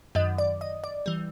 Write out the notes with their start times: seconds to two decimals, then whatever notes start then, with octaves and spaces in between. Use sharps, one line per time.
0.15 F#2 D#3 F#3 D#5
0.38 D5
0.61 D#5
0.84 D5
1.06 E3 G3